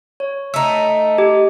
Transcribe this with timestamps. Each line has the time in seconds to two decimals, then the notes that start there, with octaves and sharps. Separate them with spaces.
0.20 C#5
0.54 A3 D#4 E6
1.18 G4